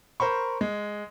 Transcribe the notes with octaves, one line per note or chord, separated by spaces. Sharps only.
A#4 C5 B5 C#6
G#3